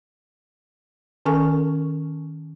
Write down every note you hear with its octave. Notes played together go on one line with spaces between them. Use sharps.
D#3 C#4 A4 A#4 G#5 C#6